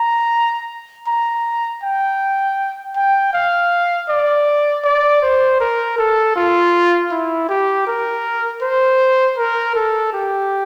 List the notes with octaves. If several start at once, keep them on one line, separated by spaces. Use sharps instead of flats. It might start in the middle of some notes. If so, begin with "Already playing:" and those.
Already playing: A#5
A#5
G5
G5
F5
D5
D5
C5
A#4
A4
F4
E4
G4
A#4
C5
A#4
A4
G4